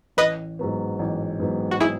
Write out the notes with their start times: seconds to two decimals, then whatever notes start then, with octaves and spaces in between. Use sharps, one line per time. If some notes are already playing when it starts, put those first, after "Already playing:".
0.17 A1 B4 D#5
0.59 G#2 F#3 B3
0.99 A1
1.39 G#2 F#3 B3
1.71 F#4
1.80 E4 G#4